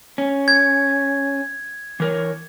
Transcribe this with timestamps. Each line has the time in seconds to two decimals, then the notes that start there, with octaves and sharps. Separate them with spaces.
0.18 C#4
0.48 G#6
2.00 E3 A#4 C#5